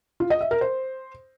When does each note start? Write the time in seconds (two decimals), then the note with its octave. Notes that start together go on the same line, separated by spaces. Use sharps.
0.20 F4
0.30 D#5
0.41 E5
0.51 A#4
0.61 C5